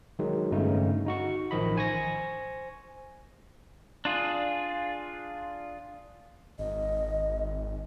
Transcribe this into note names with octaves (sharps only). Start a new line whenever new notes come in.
D#3 F#3 G#3
G1 G2 C#3 A3 D#4
D#4 F#4 C#6
A1 D#3 F3 D#5 B5
C5 G#5 C#6 A#6
D4 F4 G#4
G#1 D#5